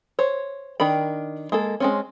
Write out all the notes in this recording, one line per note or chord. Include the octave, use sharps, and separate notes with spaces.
C5 C#5
D#3 D4 A#4 B5
G#3 A#3 A4
G#3 C4 C#4